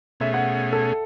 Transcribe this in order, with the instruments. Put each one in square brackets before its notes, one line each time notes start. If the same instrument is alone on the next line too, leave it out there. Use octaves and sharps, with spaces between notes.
[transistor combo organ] B2 A3 C#4 G#4 [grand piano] E5
[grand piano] F#5
A4